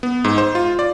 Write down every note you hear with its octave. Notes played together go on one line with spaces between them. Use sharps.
B3
G#2
C5
F4
D5